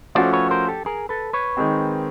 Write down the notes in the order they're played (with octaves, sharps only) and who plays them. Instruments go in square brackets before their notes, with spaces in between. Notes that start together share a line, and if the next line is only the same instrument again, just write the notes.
[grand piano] F3 A3 C#4 F#4 A4 [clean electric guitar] C5 D5
[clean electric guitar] B4 C#5
A#4 C5
G4 A4
G#4 A#4
A4 B4
B4 C#5
[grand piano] D#3 G#3 C4